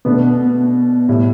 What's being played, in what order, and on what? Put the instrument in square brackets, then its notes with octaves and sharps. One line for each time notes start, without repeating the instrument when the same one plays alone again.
[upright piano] B2 A3 D4 [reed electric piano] B3
[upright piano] A2 G3